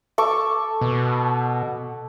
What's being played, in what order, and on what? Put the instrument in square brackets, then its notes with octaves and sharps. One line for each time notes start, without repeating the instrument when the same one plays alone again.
[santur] A4 C#6 D6
[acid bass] B2